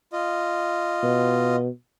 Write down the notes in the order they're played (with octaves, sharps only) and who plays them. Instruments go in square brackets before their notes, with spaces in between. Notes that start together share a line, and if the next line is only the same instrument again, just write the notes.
[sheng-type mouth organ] F4 D#5
[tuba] B2